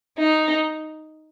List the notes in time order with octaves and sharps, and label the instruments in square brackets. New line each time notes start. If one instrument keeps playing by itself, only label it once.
[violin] D#4